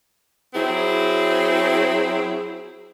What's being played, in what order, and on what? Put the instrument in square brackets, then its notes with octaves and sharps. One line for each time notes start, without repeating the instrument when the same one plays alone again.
[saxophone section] F#3 C4 E4 G#4